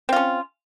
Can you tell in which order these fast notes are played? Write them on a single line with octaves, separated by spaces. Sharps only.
C4 F4 C#4